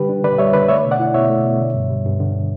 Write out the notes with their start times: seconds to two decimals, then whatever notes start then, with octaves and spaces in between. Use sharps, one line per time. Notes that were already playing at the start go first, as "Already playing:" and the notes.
Already playing: D3 G3 G4 B4
0.09 D4
0.24 D3 B4 D5
0.38 G3 C#5 E5
0.53 D3 B4 D5
0.68 A3 C#5 E5
0.85 B2
0.91 D5 F#5
1.00 E4
1.14 B2 C#5 E5
1.30 A3
1.45 B2
1.60 D3
1.74 G2
1.90 G3
2.06 G2
2.20 D3